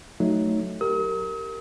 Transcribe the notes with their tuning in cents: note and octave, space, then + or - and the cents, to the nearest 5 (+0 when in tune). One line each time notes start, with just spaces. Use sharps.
F#3 +0 A3 +0 D#4 +0
G4 +0 A#4 -15 D#6 +45